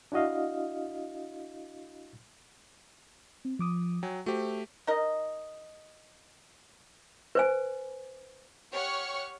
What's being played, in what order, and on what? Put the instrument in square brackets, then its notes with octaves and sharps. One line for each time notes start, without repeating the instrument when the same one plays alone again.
[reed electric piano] D4 E4 F#4 D#5 F5
[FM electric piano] C4
F3 D6 D#6
[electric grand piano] F#3 [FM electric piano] G5 G#5
[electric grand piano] A3 G4 [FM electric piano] F#4 C5
[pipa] D#4 A#4 D#5
[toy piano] B4 C5 G#5
[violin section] G4 C#5 F#5 C#6 F6